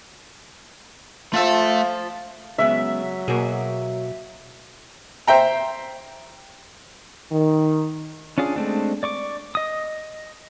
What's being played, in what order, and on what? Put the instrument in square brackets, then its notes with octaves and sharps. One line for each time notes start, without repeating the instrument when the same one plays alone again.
[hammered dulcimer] F3 F4 [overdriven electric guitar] A3 E5
[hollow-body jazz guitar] C#3 G#3 B3 [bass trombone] F#3 [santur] E5
[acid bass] B2 [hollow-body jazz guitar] A#3 F#4 G#4
[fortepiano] C5 E5 G5 A#5
[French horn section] D#3
[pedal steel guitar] C#4 D4 F4 G#4
G#3 A3 C4 D4
D5 C#6 D6
D#5 D#6